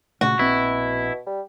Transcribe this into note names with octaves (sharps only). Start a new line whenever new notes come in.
A#2 C#3 A3 F#4
A#1 B2 C4 E4
G3